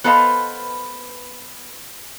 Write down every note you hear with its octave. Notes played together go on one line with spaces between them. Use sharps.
B3 A4 B4 C5 D#5 F5